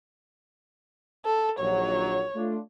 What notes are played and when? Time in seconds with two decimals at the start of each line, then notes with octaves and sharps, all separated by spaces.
1.25 A4
1.59 A#1 D#2 F#3 C#5
2.36 A3 D4 F4